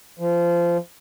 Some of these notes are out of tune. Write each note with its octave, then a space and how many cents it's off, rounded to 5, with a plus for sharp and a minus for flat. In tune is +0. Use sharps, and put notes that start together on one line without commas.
F3 -20